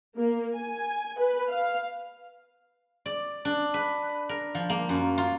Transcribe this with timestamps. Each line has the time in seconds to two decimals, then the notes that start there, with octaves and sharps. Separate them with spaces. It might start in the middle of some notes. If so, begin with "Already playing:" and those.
0.17 A#3
0.55 G#5
1.19 B4
1.50 F5
3.06 D5
3.45 D4
3.74 B4
4.29 A#4
4.55 F3
4.70 A#3
4.89 F#2
5.18 F4